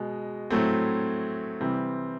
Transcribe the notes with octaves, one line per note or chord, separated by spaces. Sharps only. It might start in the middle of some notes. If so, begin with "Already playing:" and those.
Already playing: B2 G#3
A2 F#3 A3 C4
C3 E3 G3 C4